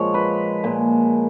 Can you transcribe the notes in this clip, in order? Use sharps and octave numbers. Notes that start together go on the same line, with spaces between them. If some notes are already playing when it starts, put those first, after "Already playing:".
Already playing: A#2 F3 G#3 C#5
B4
A#2 G#3